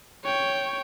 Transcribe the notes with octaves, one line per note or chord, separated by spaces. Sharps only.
C#5 G5